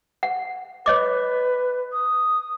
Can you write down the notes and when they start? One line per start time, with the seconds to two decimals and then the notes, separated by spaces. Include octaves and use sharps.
0.23 F#5
0.86 B4 C#5 D#5 D6
1.92 D#6